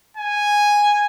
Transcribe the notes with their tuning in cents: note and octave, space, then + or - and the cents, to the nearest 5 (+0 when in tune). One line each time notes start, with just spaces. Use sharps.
G#5 -5